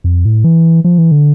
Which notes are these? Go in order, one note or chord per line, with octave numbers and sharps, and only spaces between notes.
F2
A2
E3
F3
E3
D3